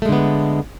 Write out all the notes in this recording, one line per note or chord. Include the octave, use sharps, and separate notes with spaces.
D3 G#3 A3 B3